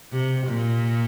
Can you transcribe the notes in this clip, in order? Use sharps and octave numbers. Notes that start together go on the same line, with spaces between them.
C3
A#2